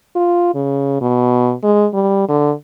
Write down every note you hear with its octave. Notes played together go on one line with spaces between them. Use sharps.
F4
C#3
B2
G#3
G3
D3